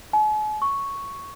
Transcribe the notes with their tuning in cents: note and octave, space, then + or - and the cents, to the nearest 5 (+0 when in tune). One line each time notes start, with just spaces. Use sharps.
G#5 +45
C#6 +0